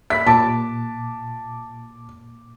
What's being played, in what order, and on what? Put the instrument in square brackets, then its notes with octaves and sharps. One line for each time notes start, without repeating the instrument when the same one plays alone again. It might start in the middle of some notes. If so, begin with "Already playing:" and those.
[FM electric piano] E5 B5 [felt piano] B6
[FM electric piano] A#2 D6 [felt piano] A5